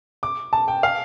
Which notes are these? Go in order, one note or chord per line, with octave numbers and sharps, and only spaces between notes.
D6
A5
G5
F5